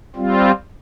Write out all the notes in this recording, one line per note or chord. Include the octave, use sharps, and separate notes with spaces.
G3 C4 F4